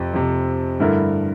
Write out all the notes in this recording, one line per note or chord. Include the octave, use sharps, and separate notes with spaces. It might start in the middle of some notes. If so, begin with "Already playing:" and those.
Already playing: F2 C3 F3
F2 C3 F3
G2 D3 A3 E4 A#4